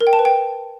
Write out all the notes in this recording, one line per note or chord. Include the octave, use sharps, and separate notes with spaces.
A#4
G5
A5
B4
G5